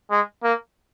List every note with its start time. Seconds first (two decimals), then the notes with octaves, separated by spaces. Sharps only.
0.11 G#3
0.44 A#3